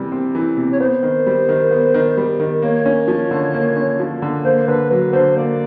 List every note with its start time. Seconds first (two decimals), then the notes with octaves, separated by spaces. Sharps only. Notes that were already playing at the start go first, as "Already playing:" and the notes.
Already playing: C3 E3 G3
0.12 C4
0.35 E3
0.57 C3
0.73 C#5
0.80 B3 C5
1.03 D#3
1.26 G3
1.49 D#3
1.71 B3
1.94 D#3
2.17 G3
2.40 D#3
2.62 A#3 C#5
2.86 C#4
3.08 F3
3.31 D3
3.54 A#3
3.76 C#4
4.00 F3
4.22 D3
4.45 A#3 C5
4.67 D3 B4
4.90 F#3 B4
5.13 D3 C5
5.36 A#3 D5